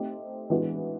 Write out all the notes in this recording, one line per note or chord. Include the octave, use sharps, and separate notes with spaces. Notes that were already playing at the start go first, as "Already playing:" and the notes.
Already playing: A3 C4 D#4 G4
E3 G#3 B3 D4 F#4